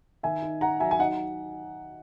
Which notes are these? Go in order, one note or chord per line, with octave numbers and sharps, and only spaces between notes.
D#3 E5 G#5
D#4
D#4 F#5 A#5
F#3 E5 G#5
G#5
D#4 D#5 F#5